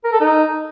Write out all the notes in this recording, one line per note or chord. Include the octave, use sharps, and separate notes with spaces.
A#4
A4
D#4